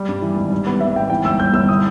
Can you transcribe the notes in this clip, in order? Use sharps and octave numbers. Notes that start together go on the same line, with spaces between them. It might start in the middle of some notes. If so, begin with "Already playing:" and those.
Already playing: G3
G2
E3
G#1
G3
B3
B3 E5
G#1 G5
E3 G5
G1 E6
G1 G6
G1 E6
E4 D#6